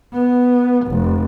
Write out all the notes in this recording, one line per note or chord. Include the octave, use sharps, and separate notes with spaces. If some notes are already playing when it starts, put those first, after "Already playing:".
B3
F1